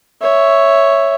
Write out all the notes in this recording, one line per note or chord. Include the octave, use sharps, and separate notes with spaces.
C#5 E5